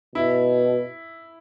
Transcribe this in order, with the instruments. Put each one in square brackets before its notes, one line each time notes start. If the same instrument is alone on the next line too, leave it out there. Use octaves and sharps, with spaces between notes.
[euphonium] B2 [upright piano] E4